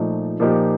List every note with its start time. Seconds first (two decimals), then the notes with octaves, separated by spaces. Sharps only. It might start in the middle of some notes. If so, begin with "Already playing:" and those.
Already playing: A#2 F3 A3 D#4
0.40 A#2 F3 A#3 D#4 G4